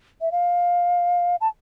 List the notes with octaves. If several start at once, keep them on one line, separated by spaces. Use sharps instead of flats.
E5
F5
A5